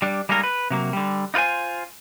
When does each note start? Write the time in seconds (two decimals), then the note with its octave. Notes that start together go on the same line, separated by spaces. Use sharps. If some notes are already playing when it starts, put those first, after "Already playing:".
0.02 G3 D4
0.29 G3 G#3 A#3 D#4 A#4
0.44 B4
0.70 C3 F#3 A#3
0.93 D3 G3
1.34 D#4 F4 B4 C5 G#5